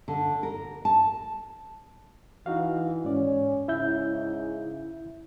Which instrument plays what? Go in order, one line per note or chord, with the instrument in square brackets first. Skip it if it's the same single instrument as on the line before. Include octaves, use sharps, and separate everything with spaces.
[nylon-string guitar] D3
A#4
A5
[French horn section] E3 [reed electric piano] D#4 F#4 F5
[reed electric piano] G#2 D5 [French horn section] C#4
[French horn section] G#2 C#3 [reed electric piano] E4 E5 G6